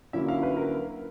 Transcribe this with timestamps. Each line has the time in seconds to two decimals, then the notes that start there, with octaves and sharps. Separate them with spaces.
0.13 D3 F#3 A#3 C#4 E4 E5
0.28 F5
0.43 B4
0.57 A#4